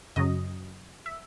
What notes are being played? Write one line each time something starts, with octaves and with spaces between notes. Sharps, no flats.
F#2 C#3 F#3 D#5
E5